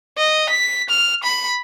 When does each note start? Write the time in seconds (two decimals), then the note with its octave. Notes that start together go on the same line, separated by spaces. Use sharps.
0.17 D#5
0.49 B6
0.89 F6
1.23 B5